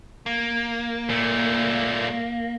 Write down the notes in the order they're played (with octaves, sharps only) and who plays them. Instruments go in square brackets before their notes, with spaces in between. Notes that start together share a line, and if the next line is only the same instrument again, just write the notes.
[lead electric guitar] A#3
[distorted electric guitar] A#2 A3